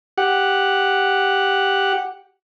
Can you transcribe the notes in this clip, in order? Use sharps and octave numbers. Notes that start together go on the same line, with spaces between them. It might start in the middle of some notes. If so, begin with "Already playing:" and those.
G4 F#5